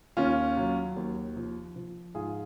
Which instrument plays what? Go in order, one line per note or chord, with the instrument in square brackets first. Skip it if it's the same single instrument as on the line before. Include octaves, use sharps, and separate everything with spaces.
[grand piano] D#2 C#4 F4
F#3
D#2
F3
F3
G#2 F4 G#4